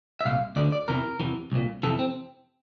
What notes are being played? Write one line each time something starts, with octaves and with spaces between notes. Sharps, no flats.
E5
C2 A#2 F5
D2 D3 D5
D5
E2 C3 E3 A#4
E2 C3 E3
C2 A#2
F2 C3 E3 A4
C4